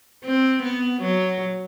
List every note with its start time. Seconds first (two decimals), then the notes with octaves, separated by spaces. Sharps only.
0.25 C4
0.63 B3
1.02 F#3